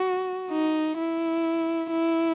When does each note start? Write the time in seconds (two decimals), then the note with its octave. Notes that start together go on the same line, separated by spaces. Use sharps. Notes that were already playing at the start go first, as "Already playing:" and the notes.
Already playing: F#4
0.51 D#4
0.99 E4
1.91 E4